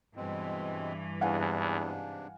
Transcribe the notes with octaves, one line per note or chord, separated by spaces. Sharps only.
G2 B2 E3 G#3 C4
E2 G#2 C3 D4 F5 F#5 G#5